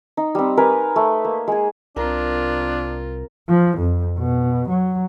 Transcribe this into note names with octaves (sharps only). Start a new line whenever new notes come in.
D#4
G3 C4
A#4 B4 G#5
A3
A#3
G#3 G#4
C2 C4 D4 F4 A#4
F3
F2
B2
F#3